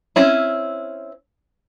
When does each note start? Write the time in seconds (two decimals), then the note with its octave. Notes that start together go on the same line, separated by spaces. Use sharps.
0.16 C4 C#4 E4